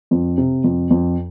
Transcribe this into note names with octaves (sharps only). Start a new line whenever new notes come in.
F2
C3
F2
F2